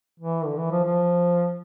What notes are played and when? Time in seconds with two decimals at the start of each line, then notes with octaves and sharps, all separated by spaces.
0.20 E3
0.46 D3
0.58 E3
0.71 F3
0.84 F3